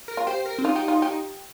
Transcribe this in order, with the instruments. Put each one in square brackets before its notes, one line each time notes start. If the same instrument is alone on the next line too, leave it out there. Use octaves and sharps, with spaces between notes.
[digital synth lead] A#4
[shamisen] F4
[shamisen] G4 [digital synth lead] C5
[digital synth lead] A#4
C4
[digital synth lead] D#4 [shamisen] F4
[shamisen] G4
F4
G4